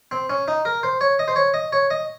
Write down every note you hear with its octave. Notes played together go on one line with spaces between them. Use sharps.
C4
C#4
D#4
A#4
C5
C#5
D#5
C5
C#5
D#5
C#5
D#5